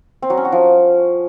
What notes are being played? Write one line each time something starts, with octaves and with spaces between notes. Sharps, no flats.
C4
F#3
C#4
F#4
F3